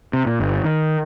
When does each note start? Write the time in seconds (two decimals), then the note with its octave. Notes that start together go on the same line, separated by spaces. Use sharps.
0.13 C3
0.26 A#2
0.40 G1
0.64 D#3